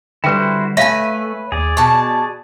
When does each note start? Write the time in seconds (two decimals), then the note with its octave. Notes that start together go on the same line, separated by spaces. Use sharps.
0.24 D3 G3 E4 F#4 B4 C5 G5
0.77 A3 B4 C#5 E5 F5 G#5
1.52 D#2 G#4 D5
1.77 B2 A5 C#6